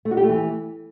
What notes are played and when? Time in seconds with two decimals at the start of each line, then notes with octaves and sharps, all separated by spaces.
0.05 A3
0.11 F#4
0.17 G4
0.23 A3
0.29 E3